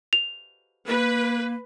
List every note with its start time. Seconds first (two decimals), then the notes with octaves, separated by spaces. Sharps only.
0.13 F7
0.88 A#3 B4